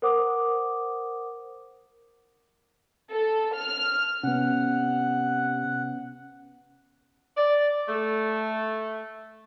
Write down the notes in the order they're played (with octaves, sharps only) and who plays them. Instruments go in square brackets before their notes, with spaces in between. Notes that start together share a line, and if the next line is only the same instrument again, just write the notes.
[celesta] A#4 C5 F#5 D6 D#6
[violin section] A4
F6
[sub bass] C3 [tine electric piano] B3 C#4 [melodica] F#5
[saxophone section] D5
A3